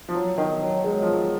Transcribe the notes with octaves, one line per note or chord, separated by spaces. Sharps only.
F3
F#3
D#3
F#3
G#3
F#3
F3
F#3